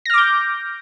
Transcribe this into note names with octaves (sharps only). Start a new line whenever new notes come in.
D6 F6 G6 A#6